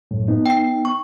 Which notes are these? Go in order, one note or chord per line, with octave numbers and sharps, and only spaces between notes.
F#2 A2
B3 D#4
G5 C7
C#6